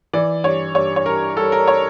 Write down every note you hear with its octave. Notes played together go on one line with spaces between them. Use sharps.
E3 D5
G2 C#5
G2 C#5
C#5
G2 A#4
G3 A4
A#4
C#5